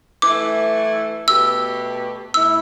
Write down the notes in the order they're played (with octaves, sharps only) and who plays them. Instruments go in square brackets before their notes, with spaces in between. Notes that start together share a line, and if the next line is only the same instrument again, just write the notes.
[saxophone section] E3 A3 E4 [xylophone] D6
[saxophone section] B2 A3 G4 B4 [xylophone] E6
[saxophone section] A2 A3 E4 [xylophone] E6